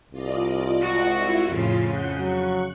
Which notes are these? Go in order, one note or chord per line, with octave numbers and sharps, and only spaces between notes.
C2 F4 D5 D#5
G#3 F#4
E4 F4 E5
F2 A2 C#3 F4 C6
F#5 F#6 G6
F#3 C#6 F#6